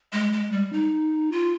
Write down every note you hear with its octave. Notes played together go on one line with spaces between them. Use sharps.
G#3
G#3
G3
D#4
F4